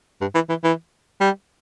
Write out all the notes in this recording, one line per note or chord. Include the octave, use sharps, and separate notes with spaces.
G2
E3
E3
E3
G3